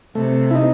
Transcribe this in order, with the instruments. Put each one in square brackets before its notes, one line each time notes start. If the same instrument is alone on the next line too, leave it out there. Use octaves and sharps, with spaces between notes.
[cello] C3 [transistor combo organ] A3
[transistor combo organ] E4
D#4